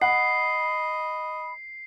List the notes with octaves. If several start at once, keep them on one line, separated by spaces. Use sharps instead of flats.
D#5 F#5 B5 C7